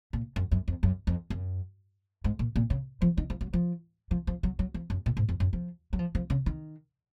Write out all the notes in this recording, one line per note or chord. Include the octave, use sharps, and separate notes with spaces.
A#2
F#2
F#2
F2
F#2
F2
F#2
G#2
A#2
A#2
C#3
F3
D#3
F3
F#3
F3
F3
F3
F#3
F#3
F3
F#2
A#2
G#2
F2
F#2
F3
F#3
F3
F3
C#3
D#3